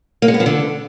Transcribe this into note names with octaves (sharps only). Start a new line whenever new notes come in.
A#3
G#3
B3
F3
D3